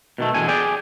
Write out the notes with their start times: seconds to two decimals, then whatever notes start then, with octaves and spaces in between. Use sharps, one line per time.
0.18 B2 D#3 A3
0.34 E2 B2 D3 G#5
0.48 G#4 D5 G5 G#5